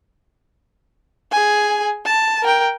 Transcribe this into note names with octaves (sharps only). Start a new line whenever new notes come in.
G#4 G#5
A5
A#4 G5